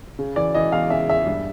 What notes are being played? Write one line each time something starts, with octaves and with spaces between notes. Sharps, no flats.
C#3
E3 D5
E3 D#5
E2 F5
C#3 E5
E2 E5
G2